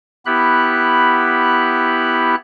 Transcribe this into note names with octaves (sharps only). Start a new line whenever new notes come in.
B3 E4 G4 B5 F#6